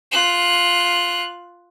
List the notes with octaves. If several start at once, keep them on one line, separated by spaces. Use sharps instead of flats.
F4 F#6